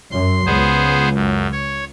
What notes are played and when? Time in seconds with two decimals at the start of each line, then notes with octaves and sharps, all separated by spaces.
0.11 F#2 F#3 C6
0.46 C#2 B3 G#4 C5
1.14 F#2
1.52 C#5